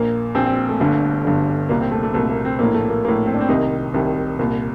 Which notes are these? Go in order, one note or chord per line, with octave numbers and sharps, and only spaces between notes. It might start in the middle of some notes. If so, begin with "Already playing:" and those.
Already playing: A#1 A#2 A#3
A#1 A#2 C4
C4
A3
G1 G2 D3
G1 G2 D3
C2 A#2 A#3
C4
A3
A3
C2 A#2 A3
A#3
C4
A#1 A2 A#3
A3
A#3
A#1 A2 A#3
C4
D4
C4
C2 C3 D#3 D#4
C2 C3 D#3
C2 A#2